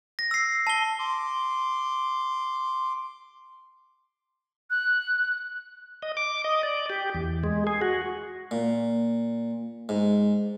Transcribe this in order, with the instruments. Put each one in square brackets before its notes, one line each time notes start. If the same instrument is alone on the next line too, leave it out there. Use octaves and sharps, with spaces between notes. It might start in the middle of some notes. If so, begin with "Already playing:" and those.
[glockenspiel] A#6
E6 C7
A5 G7
[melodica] C6 D6
[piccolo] F#6
[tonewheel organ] D#5
D6
D#5
D5
G4
E2
G#3
G#4
F#4
[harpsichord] A#2
G#2